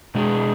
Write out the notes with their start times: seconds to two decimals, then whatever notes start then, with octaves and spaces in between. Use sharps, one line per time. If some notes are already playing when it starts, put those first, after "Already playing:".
0.15 B2 G#3 D4 G#4